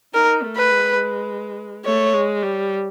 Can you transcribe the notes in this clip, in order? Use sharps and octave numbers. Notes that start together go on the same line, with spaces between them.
D#4 A#4
A3
B4
G#3
A3 C#5
G#3
G3